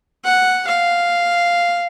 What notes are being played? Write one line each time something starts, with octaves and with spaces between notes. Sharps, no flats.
F#5
F5